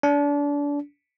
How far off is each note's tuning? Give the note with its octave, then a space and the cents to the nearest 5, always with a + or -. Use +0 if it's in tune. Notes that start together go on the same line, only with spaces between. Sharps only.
D4 -30